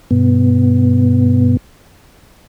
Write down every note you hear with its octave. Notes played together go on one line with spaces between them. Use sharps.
G2 B2 B3